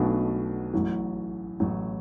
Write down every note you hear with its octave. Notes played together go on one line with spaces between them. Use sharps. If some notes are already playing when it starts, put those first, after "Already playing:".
Already playing: B1 B2 A3 D4 F#4
A1 A2 F#3
A1 A2 F#3